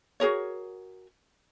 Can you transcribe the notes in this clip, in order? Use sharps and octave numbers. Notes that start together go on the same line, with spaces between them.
F#4 G#4 A#4 C#5